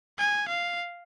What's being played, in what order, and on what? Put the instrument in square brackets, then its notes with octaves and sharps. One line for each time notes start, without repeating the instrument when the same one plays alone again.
[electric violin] G#5
F5